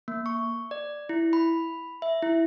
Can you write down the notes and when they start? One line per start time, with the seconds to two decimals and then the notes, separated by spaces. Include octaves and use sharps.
0.08 A#3
0.26 C#6
0.71 D5
1.09 E4
1.33 B5
2.02 E5
2.22 E4